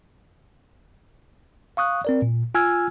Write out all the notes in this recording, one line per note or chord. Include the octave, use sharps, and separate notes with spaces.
F5 C#6 D#6 F#6
C4 A#4 D5
A#2
F4 G#5 E6 F6 G#6